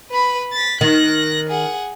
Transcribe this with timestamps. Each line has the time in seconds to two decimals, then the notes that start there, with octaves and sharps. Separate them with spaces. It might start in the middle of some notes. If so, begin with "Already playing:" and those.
0.11 B4 B5
0.53 A6 B6
0.81 D#3 F#6 A#6
1.49 G#4 F#5